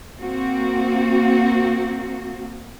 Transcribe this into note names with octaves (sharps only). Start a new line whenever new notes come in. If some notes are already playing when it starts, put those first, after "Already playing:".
A#3 C4 F#4